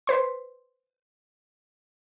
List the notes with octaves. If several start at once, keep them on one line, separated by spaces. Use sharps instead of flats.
B4 C5 C6